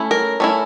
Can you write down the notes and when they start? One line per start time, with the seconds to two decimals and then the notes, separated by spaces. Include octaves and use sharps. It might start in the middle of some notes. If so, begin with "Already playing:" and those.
Already playing: A3 C#4 E4
0.11 A#4
0.40 A3 C#4 E4